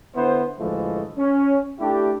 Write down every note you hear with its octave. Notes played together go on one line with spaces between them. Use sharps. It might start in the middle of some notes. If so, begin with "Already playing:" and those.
D3 B3 E4 C5
A1 D2 E3 F3 G#3 A3
C#4
A3 D4 E4 G4